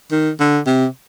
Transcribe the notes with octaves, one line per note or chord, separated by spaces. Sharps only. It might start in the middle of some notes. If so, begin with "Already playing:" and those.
D#3
D3
C3